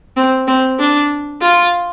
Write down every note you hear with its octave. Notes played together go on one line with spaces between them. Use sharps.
C4
C4
D4
F4